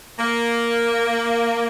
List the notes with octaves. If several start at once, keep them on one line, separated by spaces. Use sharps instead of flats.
A#3